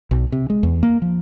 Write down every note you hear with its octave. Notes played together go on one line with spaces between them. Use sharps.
B1
C3
G#3
E2
A#3
F3